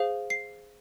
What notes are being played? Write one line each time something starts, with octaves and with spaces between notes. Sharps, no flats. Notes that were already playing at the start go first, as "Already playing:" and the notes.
Already playing: G#4 C5 F5
C7